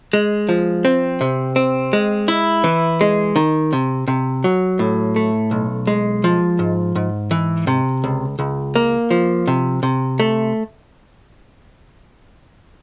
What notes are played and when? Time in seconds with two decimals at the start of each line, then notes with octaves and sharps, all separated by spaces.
0.13 G#3
0.49 F3
0.85 C4
1.21 C3
1.56 C4
1.93 G#3
2.28 E4
2.64 E3
3.01 G#3
3.36 D#3
3.73 C3
4.08 C3
4.44 F#3
4.79 A2
5.16 A3
5.51 B1
5.87 G#3
6.24 F3
6.59 G#2
6.96 G#2
7.31 E3
7.67 C3
8.04 C#2
8.39 C#2
8.76 A#3
9.11 F3
9.47 C3
9.83 C3
10.20 A3